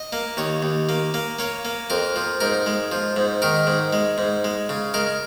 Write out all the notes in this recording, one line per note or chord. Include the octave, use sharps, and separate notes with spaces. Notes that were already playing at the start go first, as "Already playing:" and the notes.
Already playing: D#5
A#3
D#2 C#5
D#2
A#3
A#3
A#3 C#5
A#3
F2 A#4
F3
G#2 A#4
G#3
F3
G#2
D#3 A#4
G#2
G#3
G#2
G#3
C#3
G#3 A#4